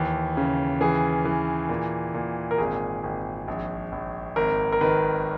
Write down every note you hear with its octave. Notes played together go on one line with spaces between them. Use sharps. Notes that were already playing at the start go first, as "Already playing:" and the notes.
Already playing: D#2 E3
C#3
E3 G#4
E3
A#2
A#2
A#4
G#1 G#4
G#1
A#1
A#1
G#1 A#4
A#4
D#3 B4